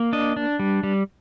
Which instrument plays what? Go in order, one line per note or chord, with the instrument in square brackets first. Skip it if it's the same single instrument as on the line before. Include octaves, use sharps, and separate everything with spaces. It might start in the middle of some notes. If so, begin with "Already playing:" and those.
Already playing: [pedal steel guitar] A#3
D4 D#5
D4
G3
G3